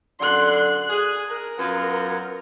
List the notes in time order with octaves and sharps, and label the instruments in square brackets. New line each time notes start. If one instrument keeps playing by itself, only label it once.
[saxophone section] F#2 D3 [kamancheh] C6 F#6
[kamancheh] F#6
[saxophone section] G#4
[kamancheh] A#4
[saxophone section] F#2 B3 F4